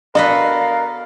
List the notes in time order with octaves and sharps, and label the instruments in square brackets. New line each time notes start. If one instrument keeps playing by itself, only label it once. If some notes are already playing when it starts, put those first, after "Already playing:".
[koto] B3 F#4 A4 [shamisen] D4 D#5 [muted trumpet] A#4 [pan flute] F5